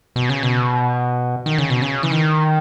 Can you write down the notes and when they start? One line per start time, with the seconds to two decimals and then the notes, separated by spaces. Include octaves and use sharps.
0.16 B2
0.29 C#3
0.43 B2
1.46 D#3
1.58 C#3
1.70 B2
1.82 C#3
2.03 E3
2.12 D#3